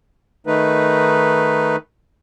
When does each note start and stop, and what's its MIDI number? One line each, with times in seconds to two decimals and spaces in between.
0.47 1.76 51
0.47 1.76 57
0.47 1.76 63
0.47 1.76 71